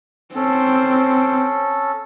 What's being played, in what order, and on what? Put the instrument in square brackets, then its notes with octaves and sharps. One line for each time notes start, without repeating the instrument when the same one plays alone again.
[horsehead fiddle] C4 [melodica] C#4 A4